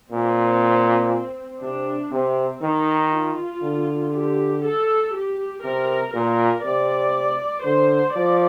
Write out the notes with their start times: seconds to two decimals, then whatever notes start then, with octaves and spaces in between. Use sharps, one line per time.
0.11 A#2 C4
1.61 C3 D4
2.12 C3 C4
2.62 D#3 D#4
3.13 F4
3.62 D3
4.12 G4
4.64 A4
5.14 G4
5.63 C3 A#4
6.14 A#2 A#4
6.64 C3 D5
7.64 D3 C5
8.15 F3 D5